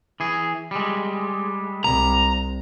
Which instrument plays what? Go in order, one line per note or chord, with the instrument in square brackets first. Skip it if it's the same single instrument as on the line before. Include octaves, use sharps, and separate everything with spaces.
[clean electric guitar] E3 G#4
G3 G#3
[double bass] C2 [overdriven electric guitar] A#5